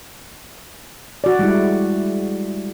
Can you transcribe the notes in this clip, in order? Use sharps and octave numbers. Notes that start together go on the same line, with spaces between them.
F#4 D5
G3 G#3 E4